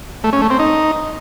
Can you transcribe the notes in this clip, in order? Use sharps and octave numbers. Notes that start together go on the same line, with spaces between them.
A3
C#4
A3
C4
D#4